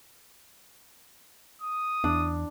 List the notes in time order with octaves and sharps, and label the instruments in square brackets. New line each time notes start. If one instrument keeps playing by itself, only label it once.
[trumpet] D#6
[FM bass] E2 [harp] D4